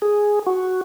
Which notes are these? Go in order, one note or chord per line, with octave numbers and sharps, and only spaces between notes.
G#4
F#4